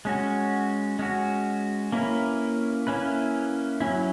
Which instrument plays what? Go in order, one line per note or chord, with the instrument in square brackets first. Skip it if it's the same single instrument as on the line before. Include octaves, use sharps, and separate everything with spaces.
[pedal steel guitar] G#3 C#4 F#4
G#3 C#4 F#4
A#3 C#4 E4 B4
A#3 C#4 E4 B4
F#3 C#4 E4